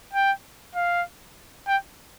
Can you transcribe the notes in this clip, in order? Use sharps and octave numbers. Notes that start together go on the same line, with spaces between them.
G5
F5
G5